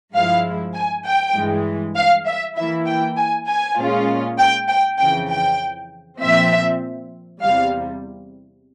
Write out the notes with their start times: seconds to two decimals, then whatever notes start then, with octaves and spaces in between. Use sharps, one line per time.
0.14 G2 F3 G#3 E4 F5
0.75 G#5
1.05 G5
1.35 G2 E3 G#3
1.96 F5
2.26 E5
2.56 E3 A#3 E4 E5
2.86 G5
3.17 G#5
3.47 G#5
3.78 A#2 G#3 C#4 F4
4.38 G5
4.68 G5
4.98 F2 C#3 E3 G5
5.29 G5
6.20 A#2 F3 C4 E5
7.41 E2 C3 G3 F5